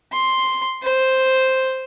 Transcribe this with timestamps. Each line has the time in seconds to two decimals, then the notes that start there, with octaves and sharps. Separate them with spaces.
0.12 C6
0.82 C5